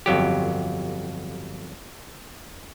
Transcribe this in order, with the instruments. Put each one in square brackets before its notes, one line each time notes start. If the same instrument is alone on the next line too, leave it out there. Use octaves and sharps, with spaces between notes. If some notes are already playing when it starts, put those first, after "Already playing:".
[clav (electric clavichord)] G1 F2 F#3 G4